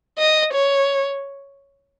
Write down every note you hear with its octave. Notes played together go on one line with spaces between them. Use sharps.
D#5
C#5